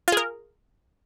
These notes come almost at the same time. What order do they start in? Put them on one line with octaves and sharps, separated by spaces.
F4 G#4 A#4